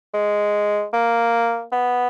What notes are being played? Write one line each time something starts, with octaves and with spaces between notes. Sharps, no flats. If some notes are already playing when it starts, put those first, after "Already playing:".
G#3
A#3
B3